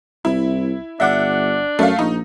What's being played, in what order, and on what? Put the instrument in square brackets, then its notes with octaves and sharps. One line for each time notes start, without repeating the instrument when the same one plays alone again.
[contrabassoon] C2 [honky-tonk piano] E4
[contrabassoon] G1 [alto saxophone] D4 [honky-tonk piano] E5 F#5 D6
[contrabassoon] F#2 [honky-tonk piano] A3 F5
[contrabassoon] A#1 [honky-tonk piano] D#4